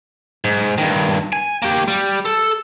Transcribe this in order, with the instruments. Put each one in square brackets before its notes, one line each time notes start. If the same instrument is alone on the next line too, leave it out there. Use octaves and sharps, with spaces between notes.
[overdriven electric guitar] G#2
G2 D#3
G#5
A#3 G4
G3
A4